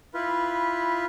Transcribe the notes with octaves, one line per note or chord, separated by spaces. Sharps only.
E4 F4 B4